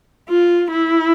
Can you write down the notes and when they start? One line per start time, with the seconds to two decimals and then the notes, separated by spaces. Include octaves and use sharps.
0.29 F4
0.71 E4